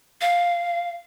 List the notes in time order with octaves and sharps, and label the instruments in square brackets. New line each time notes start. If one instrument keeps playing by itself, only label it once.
[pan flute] F5